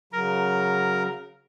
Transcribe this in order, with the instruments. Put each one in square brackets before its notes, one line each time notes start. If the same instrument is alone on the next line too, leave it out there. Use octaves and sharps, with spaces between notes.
[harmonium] C#3 F#3 [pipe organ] A#4